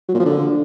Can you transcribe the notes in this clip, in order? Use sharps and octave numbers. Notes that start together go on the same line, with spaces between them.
F#3
A#2
F3
D3